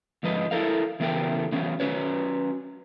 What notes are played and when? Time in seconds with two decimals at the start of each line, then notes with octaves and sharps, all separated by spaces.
0.23 G#2 F3 B4 D#5
0.51 E4 A4 A#4 F5
1.00 C#3 E3 A3 B3 A#4 G5
1.52 E3 F#3 B3 C#4
1.80 C#4 F#4 B4 C#5